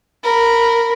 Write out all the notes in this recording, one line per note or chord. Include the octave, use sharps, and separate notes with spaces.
A#4 B5